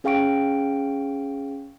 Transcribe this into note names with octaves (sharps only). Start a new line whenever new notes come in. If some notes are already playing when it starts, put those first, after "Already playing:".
C#4 G#4 F5 G5 C#6 D7